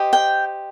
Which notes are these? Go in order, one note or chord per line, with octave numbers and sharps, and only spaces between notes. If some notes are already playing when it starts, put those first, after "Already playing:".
Already playing: G4 C5 D#5
G5